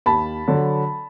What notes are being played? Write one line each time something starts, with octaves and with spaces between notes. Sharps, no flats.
D#2 A5 B5
D3 F#3